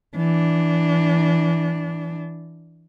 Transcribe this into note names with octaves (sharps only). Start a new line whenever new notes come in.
E3 D4